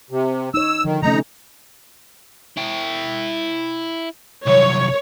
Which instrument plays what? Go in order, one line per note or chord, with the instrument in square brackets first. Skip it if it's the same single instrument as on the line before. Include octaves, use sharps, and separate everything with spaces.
[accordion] C3
[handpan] D#4 C#5 [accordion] E6
[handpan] D3 F3 [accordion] D#3
[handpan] C3 A3 C#4 [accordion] D#4 A#5
[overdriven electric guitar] E4 G5
[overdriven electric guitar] C2 F#2 [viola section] C#5